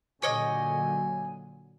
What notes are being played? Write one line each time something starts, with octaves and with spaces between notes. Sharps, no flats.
A#2 D3 F#3 G4 C#5 D#5 G#5